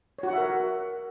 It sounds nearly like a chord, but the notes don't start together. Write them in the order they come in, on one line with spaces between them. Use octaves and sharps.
C#5 F#4 F#5 E5 A#4